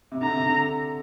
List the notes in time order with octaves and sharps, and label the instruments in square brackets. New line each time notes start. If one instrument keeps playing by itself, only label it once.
[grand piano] C3
[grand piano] D3 [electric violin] A#5
[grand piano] C3
D3